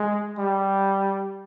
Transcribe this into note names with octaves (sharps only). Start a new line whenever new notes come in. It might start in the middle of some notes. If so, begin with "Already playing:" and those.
Already playing: G#3
G3